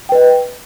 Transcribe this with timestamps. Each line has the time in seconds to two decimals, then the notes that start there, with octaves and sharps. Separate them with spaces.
0.09 G5
0.12 B4
0.15 D#5